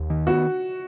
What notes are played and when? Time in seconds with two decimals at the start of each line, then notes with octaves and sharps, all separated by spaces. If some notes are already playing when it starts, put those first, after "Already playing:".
Already playing: D#2
0.10 D#3
0.27 B3 F#4